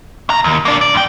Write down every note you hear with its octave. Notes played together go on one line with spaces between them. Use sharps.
C2 A#5
D#2
A#3 D4
D5
F2 G5